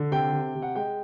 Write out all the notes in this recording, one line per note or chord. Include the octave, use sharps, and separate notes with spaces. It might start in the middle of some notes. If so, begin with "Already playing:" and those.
Already playing: D3
C3 G5
C3
C3
F#5
G#3 G5